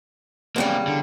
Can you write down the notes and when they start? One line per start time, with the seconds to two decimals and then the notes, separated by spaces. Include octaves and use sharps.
0.56 E2 C#3 G3 A#3 C4
0.87 D3